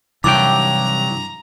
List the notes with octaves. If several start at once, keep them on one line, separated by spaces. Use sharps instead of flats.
G2 C3 D#3 E3 F#3 G5 A#5 D6